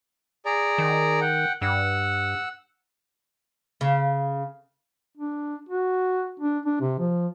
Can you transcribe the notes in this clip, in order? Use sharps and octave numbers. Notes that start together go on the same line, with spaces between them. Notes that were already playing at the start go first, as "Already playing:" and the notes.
G#4 D5 A#5
D#3
F#5 G5
G2 F#5 E6
C#3
D4
F#4
D4
D4
C3
F3